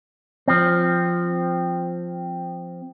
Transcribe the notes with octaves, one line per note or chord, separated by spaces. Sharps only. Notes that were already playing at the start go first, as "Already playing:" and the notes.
F3 C4